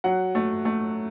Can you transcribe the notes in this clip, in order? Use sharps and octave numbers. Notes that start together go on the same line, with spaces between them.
F#3 F#5
A3
A3